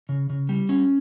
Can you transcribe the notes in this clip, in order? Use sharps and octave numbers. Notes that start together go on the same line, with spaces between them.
C#3
C#3
G3
C#4